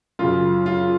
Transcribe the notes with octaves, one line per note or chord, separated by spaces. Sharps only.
F#2 C#3 F4
F4